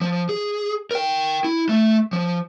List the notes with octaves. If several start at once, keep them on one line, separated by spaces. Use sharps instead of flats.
F3
G#4
A#4 G5
E4
A3
F3